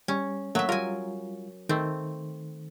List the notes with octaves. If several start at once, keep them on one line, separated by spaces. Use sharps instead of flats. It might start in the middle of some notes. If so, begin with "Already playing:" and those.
G3 C#4
F#3 A3 A#3 E5
G3 F4 A#4 G#5
D#3 A3 C4